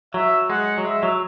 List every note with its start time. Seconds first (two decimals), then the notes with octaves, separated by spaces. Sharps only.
0.14 F#3 E5
0.50 G#3 F#5
0.78 F#3
0.85 G#3 E5
1.03 F#3